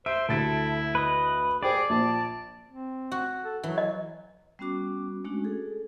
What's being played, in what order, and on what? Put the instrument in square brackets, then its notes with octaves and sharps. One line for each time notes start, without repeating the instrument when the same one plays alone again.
[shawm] C5 [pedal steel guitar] E5 [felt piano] D7
[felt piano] D2 A6 D7 [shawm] E4 [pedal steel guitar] A4
[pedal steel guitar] B4 D#5
[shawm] G#4 [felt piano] C5 G5 D6 [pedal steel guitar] D5
[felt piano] A#1 [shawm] A5
[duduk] C4
[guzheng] F#4
[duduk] A4
[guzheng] E3 [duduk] F#3
[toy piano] D#5
[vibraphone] G3 B3 C#4 F#4 D6
G#3 A3 C#4 D4 F#4
G#4 A4